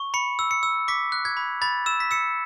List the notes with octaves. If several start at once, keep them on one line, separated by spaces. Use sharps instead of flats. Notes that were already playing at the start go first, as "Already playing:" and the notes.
Already playing: C#6
B5 C#7
E6
C#7
E6
D6 B6
F#6
G#6
B5
B5 A6
E6 E7
B6
E6 C#7